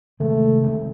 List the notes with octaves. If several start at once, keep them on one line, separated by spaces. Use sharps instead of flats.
C3 D#3 G#3 A3 C4
C3 D#3 G#3 C4